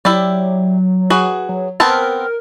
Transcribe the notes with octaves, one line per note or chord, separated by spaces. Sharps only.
F#3 E4 G4 D5
F#4 G#4 B4
F#3
B3 C4 A#4 A5